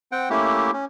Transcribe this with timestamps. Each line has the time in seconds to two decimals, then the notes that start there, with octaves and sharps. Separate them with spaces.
0.12 C4 F#5 G5
0.30 A3 A#3 C#4 E4 G4
0.74 C#4